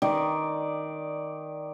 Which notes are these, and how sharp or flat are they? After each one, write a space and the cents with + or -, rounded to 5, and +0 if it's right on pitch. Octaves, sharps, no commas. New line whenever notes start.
D#3 +0 D5 +0